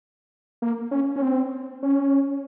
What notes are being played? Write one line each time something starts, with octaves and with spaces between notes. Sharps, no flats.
A#3
C#4
C#4
C4
C#4